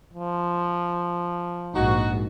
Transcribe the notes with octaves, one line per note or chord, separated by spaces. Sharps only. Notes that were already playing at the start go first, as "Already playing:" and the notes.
F3
A#1 G#2 D#4 F#4